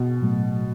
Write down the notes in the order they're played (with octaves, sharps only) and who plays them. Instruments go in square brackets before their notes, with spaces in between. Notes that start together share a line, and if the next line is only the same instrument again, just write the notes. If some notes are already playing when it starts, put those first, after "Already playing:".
Already playing: [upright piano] B2
[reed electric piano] A2 F#3 A3